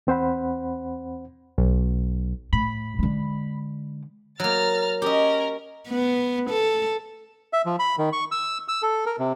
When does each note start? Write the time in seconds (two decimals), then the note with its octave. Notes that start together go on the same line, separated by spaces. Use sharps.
0.07 E2 C4 C5 F#5 B5
1.58 B1
2.53 A2 B5
2.99 D3 G#3
4.40 F#3 A#3 A#5 F6 A6
5.02 C#4 G4 A#4 D#5
5.88 B3
6.50 A4
7.53 E5
7.66 F3
7.79 B5
7.98 D#3
8.13 C#6
8.31 E6
8.68 E6
8.82 A4
9.06 A#4
9.19 C3